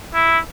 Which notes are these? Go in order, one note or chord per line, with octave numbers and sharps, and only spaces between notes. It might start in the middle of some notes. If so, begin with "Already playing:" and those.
E4